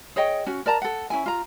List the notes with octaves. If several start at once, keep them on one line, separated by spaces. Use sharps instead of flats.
G#4 C#5 D#5 G5
C#4 F#4
A#4 D5 A5 A#5
A4 F#5
C#4 E4 G#5
F4 A#5